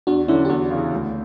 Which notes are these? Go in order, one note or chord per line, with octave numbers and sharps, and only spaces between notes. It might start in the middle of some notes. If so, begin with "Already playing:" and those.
E2 D4 F#4
D3 F#3 C#4 E4
G4
E2 D4 F#4
C#3 E3
D2